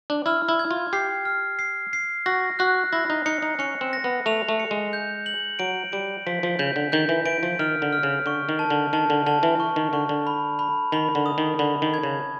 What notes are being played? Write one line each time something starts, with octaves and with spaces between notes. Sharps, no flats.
D4
E4 F6
E4
G#6
F4
G4 C7
F6
C7
C7
F#4 A#6
F#4 F#6
E4 A#6
D#4
D#4 C#7
D#4
C#4 C#7
C4
A#6
B3
A3 F7
A3
C#7
G#3
G6
F#7
F#3 D7
G3 D7
F3 B6
F3
C#3 G6
D3
D#3 G6
E3
E3 D7
F3
D#3 F6
D3
F6
C#3
D3 C#6
D#3
A5
D3
D#3 A5
D3
D3 A5
E3
C#6
D#3
D3 C#6
D3
B5
B5
D#3 B5
D3
D#6
D#3
D3 B5
D#3
G#6
C#3